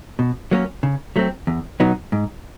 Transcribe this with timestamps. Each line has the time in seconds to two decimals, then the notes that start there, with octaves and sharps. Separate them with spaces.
0.19 B2
0.51 F#3 A#3 C#4
0.83 C#3
1.16 F#3 A3 C4
1.47 E2
1.80 B2 F#3 B3 D#4
2.12 G#2